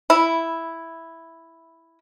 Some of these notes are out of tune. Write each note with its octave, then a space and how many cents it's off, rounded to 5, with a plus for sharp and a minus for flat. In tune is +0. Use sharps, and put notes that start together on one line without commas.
E4 +0 B5 -10